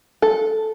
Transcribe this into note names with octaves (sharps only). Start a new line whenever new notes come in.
A4